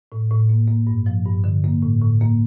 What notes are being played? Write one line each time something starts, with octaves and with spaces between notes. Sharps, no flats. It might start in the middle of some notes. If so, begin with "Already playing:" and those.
A2
A2
A#3
A#3
G2
F3
G2
D3
A#3
A2
A2
A#3